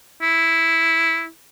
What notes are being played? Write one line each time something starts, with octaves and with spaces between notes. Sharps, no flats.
E4